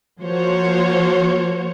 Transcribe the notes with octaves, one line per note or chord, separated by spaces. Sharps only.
F3 A#3 F#4 C5 C#5